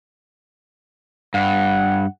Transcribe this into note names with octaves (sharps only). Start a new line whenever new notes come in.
G2 F#5